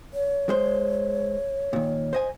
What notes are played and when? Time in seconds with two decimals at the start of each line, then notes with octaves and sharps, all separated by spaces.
0.14 C#5
0.49 G#3 C5
1.73 A#2 D#3
2.13 C5 D#5 G#5